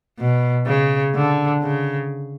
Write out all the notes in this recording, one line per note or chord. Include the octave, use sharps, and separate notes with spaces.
B2
C#3
D3
C#3